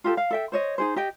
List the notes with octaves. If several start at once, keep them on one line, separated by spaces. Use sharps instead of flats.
F4 G4 A4
F5
A4 E5 G5
C5 C#5 D#5
D#4 G#4 C5
G4 D#5 G5